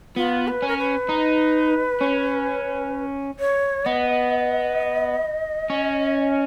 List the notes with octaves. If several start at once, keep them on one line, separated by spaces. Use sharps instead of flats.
B3 F4
B4
C#4
A#4
B4
D#4
C#4
C#5
B3 D#5
C#4